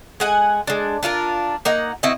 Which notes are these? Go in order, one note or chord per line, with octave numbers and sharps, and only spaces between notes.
G#3 F#5 G#5
G#3 D4
D4 F4 A4 A#4
A#3 D#4 F#5
C4 E4 F#4 D#5